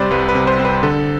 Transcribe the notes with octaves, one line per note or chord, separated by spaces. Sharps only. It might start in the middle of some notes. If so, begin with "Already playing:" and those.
Already playing: C3 G3 C4 B4 C5 D5
C2 B4
B4
C3
C5
C4
B4
D3 A4